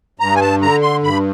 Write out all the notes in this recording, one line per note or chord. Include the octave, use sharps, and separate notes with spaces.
G2 A#5
G#5
A5
D3 A#5
C6
G2 B5